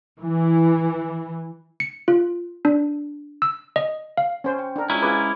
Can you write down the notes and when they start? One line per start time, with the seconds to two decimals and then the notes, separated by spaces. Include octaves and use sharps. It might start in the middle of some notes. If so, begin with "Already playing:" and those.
0.21 E3
1.80 C#7
2.08 F4
2.65 D4
3.42 E6
3.76 D#5
4.17 F5
4.44 C#4 C5
4.59 G5
4.76 D4 A#4
4.90 G#3 C#4 E4 F4 A#5
5.02 F4 G#4 B4 B5 D6 G#6